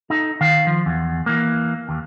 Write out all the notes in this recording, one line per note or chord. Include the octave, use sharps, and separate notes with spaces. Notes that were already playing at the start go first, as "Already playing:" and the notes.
D#4 A4
D#3 F5
F3
E2
E3 A#3
D#2